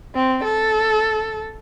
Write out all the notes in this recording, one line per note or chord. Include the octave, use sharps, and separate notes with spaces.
C4
A4